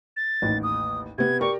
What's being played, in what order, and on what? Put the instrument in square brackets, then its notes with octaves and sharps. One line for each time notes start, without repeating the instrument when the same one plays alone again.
[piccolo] A6
[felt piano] A1 D#2
[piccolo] D#6
[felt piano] C3 B3 [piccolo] G#6
[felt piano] G4 A#4 D5 [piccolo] C#6